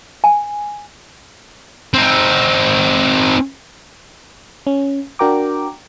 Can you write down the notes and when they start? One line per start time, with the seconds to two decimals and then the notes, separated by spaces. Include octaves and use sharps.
0.24 G#5
1.94 C4 D#4
4.67 C#4
5.19 D4 F#4 A#4 G5 A#5 D6